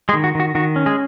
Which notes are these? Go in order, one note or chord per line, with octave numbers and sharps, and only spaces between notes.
G#3 G#4
D#3
F#4
D#3 F#4
D#3 F#4
C#4
G#3 G#4